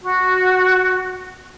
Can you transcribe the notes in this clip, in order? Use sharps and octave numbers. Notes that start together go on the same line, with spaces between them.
F#4